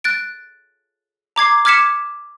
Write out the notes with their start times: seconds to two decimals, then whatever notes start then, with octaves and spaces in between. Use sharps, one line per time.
0.04 F#6 A6 D7
1.36 A#5 D6 G#6 C7
1.65 D6 F6 G#6 B6 C#7 E7